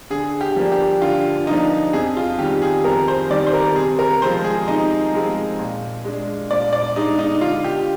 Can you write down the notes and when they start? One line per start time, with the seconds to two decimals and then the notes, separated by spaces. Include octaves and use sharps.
0.10 D3 G#4
0.41 G4
0.56 F3 A#3 D4
0.72 G4
1.02 D3 F4
1.47 F3 A#3 D4 D#4
1.93 F2 G#4
2.17 F4
2.39 D#3 G3 G4
2.62 G#4
2.85 F2 A#4
3.08 C5
3.30 D#3 G3 D5
3.47 C5
3.53 A#4
3.76 C3 G#4
3.99 A#4
4.22 F3 G#3 C4 C5
4.44 G#4
4.67 C3 D#4
5.13 F3 G#3 C4
5.59 A#2
6.04 G#3 D4
6.50 A#2 D5
6.73 D5
6.96 G#3 D4 D#4
7.19 D#4
7.41 D3 F4
7.64 G4